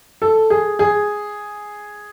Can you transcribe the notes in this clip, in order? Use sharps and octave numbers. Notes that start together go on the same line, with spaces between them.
A4
G#4
G#4